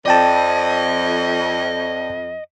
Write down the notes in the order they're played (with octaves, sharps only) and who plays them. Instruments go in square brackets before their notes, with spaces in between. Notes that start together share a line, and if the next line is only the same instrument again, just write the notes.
[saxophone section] F2 [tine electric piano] D5 G5 A5 [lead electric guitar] D#5